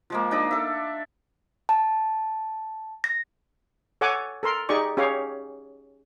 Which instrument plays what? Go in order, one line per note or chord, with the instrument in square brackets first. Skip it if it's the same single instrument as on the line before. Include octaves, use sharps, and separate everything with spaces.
[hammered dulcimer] F3 G#3 A#3
D4 D#4 D5 D#5
A4 E5
[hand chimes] A5
A#6
[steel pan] A4 C#5 F#5 G#5 D6
A4 A#4 C6
D#4 G4 G#4 D5 C#6
C#4 G4 G#4 C#5 F5